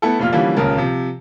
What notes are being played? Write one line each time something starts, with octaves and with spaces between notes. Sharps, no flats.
A3 B3 E4 A4
F1 A#2 F4 F6
D3 E3 F3 G3 A#3 C#4
D#1 C#2 C#3 A#4 A5
C3 F3